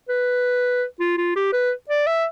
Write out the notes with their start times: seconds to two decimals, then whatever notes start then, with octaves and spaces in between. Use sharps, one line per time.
0.09 B4
1.00 F4
1.17 F4
1.36 G4
1.53 B4
1.89 D5
2.07 E5